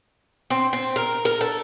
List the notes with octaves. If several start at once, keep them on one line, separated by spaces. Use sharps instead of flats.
C4
C4
A#4
A#4
A4